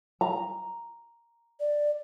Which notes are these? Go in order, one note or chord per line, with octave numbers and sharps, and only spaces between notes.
A#5
D5